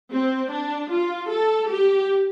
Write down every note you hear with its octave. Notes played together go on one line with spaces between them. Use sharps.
C4
D4
F4
A4
G4